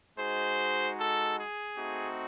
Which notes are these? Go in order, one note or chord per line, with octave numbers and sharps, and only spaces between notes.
G#3 D#4 F#4 G#4 C5
A4
G#4
A3 C4 D#4 F#4